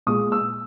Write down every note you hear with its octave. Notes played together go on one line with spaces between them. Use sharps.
A#2 G#3 D#6
E6